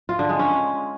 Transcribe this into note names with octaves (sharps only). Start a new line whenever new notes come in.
F4
D3
G#3
C#4